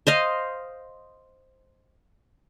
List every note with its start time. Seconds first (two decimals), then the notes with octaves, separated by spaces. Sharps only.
0.07 C5 D#5 F5